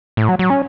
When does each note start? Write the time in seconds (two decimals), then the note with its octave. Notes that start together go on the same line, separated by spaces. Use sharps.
0.17 A2
0.29 F#3
0.39 F#3
0.50 C#4